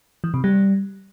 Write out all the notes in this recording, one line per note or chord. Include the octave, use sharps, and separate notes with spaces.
E3
C3
G3